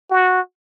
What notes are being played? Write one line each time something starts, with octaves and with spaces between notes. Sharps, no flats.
F#4